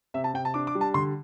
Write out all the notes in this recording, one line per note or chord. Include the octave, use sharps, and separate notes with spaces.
C3 E5
A5
C3 G5
A5
D4 D6
D6
G3
A5
D3 C6